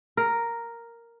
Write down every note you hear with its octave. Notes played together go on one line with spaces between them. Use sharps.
A#4